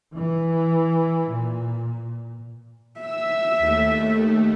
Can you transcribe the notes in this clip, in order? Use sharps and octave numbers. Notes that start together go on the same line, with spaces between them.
E3
A#2
E5 E6
D#2 A3